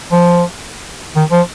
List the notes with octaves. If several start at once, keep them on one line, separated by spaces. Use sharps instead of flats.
F3
D#3
F3